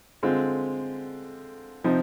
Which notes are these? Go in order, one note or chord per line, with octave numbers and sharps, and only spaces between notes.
D3 G#3 C4 F4
C3 F3 C4 D#4